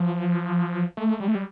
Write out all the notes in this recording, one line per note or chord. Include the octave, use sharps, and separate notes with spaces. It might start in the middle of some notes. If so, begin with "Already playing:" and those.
Already playing: F3
A3
G3
A3
G3